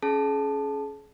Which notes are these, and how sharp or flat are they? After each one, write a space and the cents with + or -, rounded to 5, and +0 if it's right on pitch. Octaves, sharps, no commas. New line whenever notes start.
C#4 +0 G#4 +35 A5 +0